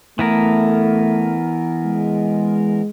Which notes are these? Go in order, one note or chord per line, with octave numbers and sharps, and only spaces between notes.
E3 A3 B3 A#4
G#3